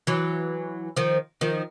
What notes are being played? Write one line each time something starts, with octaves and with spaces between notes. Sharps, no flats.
E3 F#3
D#3 F3
D#3 F3